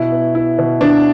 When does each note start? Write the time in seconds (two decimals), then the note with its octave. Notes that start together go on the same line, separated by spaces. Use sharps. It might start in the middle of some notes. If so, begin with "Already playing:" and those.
Already playing: B2 E4
0.12 B3
0.35 B3 E4
0.59 B2
0.81 B2 D4